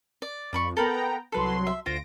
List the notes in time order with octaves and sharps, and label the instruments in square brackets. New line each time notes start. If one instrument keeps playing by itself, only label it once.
[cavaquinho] D5
[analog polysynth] F2 [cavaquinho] D5 B5 C#6
[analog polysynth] B3 G5 A#5 [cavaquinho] A4 A#4 B5
[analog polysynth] C2 F#3 C6 [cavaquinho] A4 B4
[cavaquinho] E5
[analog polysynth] D2 A#6 D7 [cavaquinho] F4 C5